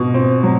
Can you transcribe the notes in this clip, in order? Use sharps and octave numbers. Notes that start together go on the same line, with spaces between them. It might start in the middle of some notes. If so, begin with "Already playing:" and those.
Already playing: B2
C4
F#3